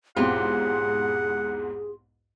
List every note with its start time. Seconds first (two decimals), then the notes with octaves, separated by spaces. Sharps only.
0.16 B1 E2 G#2 C4 F4 G4 G#4 F#5